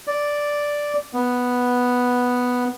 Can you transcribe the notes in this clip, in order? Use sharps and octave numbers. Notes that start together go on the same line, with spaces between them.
D5
B3